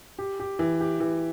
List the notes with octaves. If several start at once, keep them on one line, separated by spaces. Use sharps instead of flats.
G4
G4
E3
G4
E3